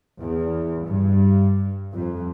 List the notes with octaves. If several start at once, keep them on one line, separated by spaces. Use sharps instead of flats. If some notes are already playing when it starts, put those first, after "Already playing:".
E2
G2
F2